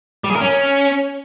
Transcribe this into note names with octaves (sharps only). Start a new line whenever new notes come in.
G3
G#4
A#4
C#4